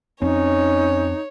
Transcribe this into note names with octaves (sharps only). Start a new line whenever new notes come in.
F2 C4 C#4 D#4 C#5